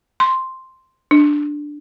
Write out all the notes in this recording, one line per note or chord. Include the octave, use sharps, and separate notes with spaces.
C6
D4